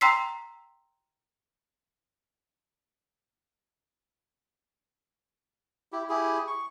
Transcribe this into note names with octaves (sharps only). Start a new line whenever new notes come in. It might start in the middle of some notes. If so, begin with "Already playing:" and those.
G5 A#5 C6 E6 B6 C7
E4 G4
E4 G4 G#4
C#6